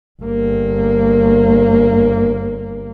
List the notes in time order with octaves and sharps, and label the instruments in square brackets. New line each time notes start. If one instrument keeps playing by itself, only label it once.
[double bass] G1 A#3